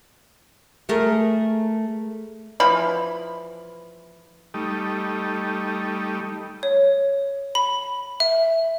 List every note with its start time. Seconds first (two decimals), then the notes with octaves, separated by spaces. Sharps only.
0.89 A3 G#4 A#4
2.60 E3 F3 B5
4.54 G3 A3 D#4
6.63 C#5
7.55 B5
8.20 E5